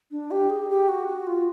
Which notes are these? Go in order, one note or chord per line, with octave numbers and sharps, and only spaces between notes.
D4
G4
G#4
G4
F#4
F#4
F4